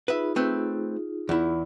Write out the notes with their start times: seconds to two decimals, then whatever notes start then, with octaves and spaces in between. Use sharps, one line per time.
0.08 D#4 F4 G#4 B4 E5
0.36 A3 C4 B4
1.29 E2 E4